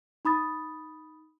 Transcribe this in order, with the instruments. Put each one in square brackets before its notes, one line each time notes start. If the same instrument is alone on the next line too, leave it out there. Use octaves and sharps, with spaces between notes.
[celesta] D#4 B5 D#6 A6